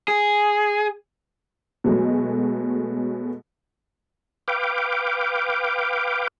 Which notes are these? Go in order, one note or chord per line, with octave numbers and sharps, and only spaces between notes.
G#4
B2 F#3 G#3 A3
B4 F5 G5 D6